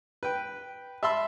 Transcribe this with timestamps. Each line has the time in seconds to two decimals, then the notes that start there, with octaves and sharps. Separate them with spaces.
0.23 B4 G5
1.03 E5 A5 B5 C6 E6